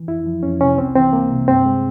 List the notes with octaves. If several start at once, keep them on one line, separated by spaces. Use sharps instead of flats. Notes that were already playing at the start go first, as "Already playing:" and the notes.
Already playing: E3
F2 E4
F3
F2 C#4
C3 C#4
C2 C4
E3 C4
A#3
C3
G2 C4
G#3